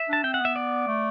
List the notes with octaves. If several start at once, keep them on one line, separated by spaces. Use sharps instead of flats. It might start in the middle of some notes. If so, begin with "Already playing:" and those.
Already playing: E5
D4 A5
C4 G5
F#5
B3
E5
D5
A3